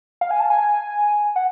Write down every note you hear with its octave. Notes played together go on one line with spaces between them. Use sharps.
F5
G#5
A5
G#5
F#5